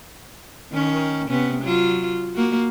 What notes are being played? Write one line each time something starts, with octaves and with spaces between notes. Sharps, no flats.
D#3 C#4
C3 B3 C#4
F#3 F4
A#3 F#4